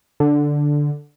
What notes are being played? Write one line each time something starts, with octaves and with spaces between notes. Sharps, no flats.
D3